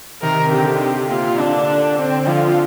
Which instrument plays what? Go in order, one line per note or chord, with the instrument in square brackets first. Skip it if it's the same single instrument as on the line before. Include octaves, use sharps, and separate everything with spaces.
[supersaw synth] C3 D#3 [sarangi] A#4
[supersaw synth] D3 [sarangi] G4
[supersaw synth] C3
[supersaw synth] A#2 [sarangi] F4
[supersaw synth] D3 [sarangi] D4
[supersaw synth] D3
[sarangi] C4
[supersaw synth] D3 F3 [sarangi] F4